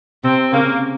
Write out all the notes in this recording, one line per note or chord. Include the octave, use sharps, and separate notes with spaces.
C3 C4
C#3 A#3